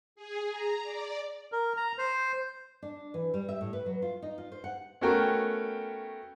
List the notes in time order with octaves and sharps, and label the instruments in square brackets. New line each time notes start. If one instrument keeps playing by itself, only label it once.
[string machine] G#4
A#5
D5
[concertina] A#4
A#5
C5
[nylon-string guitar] D4
E3
G3
E5
A2
B4
F#3
F4
D#4
F4
C5
F#5
[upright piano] A3 B3 C#4 F#4 A#4 G5